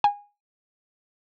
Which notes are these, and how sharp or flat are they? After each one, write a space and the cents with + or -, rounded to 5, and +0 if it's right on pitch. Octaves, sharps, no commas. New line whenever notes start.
G#5 -20